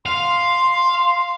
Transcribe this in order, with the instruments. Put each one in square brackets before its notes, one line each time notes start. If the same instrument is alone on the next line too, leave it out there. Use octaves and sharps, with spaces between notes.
[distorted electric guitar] F5 [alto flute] C6